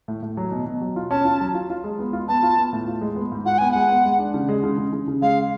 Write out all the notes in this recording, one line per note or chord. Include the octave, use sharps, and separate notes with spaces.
A2
A2
F#3
B2
B2
F#3
F4
C#4 A5
F4
F#3
F4
F4
G#3
B3
F4
B3 A5
F4
B3
A2
F4
G#3
B3
G#2
F4 F#5
B3 G#5
G#3 F#5
B3
G#3
D4
C#3
G#3
C#3
C#3
C#3
C#3
G#3 F5